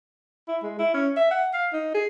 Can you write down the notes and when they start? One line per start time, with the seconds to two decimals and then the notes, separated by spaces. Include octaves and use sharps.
0.48 E4
0.63 G#3
0.79 E4
0.94 C#4
1.17 E5
1.31 F#5
1.54 F5
1.73 D#4
1.95 G#4